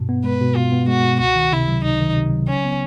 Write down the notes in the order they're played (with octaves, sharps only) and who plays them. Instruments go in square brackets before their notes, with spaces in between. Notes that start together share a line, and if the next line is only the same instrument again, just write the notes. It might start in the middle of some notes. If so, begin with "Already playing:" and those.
Already playing: [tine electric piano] G2 B2
B3
[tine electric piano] G#3 [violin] B4
[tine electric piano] B2
[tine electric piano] B2 [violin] F4
[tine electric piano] B3
[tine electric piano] G#3 [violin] F#4
[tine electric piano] B2
[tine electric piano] C#2 [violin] F#4
[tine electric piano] D#3
[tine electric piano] C3 [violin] E4
[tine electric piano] F#3
[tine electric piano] C#2 [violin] D#4
[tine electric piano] D#3
C3
F#3
[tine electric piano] C#3 [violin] C#4
[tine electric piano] B3